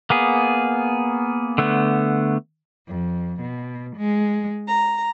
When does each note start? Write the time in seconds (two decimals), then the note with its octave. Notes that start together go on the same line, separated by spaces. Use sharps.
0.10 A#3 B3 G#4
1.58 D3 A3 B3
2.87 F2
3.41 B2
3.96 G#3
4.67 A#5